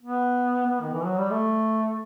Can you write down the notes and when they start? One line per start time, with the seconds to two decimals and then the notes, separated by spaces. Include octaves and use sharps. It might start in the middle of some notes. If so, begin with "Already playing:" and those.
0.03 B3
0.66 B3
0.81 D#3
0.93 E3
1.05 F#3
1.18 G3
1.30 A3